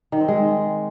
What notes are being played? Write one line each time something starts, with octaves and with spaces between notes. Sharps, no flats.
D#3
C4
G#3